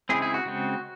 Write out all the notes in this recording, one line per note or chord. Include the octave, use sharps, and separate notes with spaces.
C#3 G#3 C4 E4 G#4
E4 G#4
F#4
C#3 G#3 C4